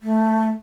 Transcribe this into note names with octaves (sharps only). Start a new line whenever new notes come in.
A3